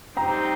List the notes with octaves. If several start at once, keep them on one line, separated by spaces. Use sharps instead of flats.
G3 C4 D#4 G4 C5 G5 A#5